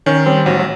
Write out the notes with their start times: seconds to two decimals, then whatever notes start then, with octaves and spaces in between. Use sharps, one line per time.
0.06 D#3 C#4
0.26 G3 C4
0.46 A1 F#3
0.59 F#3